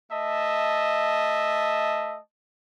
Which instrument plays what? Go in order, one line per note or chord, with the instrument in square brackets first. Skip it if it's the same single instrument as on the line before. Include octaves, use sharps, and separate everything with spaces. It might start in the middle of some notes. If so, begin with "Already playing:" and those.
[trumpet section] A3 D#5 E5 A5